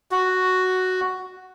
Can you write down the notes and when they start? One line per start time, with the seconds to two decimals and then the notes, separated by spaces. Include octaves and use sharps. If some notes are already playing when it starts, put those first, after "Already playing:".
0.11 F#4